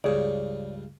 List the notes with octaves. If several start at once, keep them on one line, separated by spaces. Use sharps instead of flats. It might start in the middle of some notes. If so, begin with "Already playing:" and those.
C#2 G2 G#4 C#5 D5